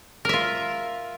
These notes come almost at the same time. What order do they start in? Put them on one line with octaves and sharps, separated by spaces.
A#4 E5 F4